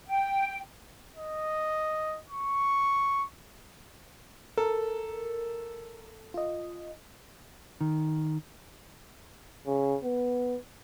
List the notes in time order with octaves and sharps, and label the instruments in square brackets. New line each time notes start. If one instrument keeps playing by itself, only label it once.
[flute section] G5
[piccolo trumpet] D#5
C#6
[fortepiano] A4 [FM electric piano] A#4
[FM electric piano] F4 D#5
[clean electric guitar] D#3
[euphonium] C#3
B3